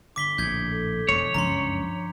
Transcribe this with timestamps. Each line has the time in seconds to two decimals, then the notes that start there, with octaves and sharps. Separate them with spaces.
0.16 G1 D6 B6 G7
0.38 A#1 A2 G6 G#6
0.66 A4
1.09 E1 F2 G#3 A3 F4 C#5 D6
1.34 F#1 C#2 G2 F3 C#4 A#5 C6